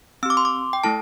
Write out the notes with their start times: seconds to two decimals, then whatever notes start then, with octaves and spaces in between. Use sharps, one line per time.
0.23 C4 E6
0.26 G4 D6
0.37 C6
0.45 D6
0.73 G5
0.84 A3 E4 A4 A5